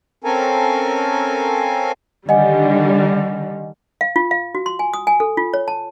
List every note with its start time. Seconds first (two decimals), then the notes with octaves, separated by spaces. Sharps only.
0.24 C4 C#4 A4 A#4 F5 G#5
2.29 D3 D#3 G3 D#5 F#5 G#5
4.01 F5
4.16 F4
4.31 F5
4.55 F#4
4.66 C6
4.79 G#5
4.94 D#6
5.07 G#5
5.20 A4
5.37 F4
5.54 C#5
5.68 A5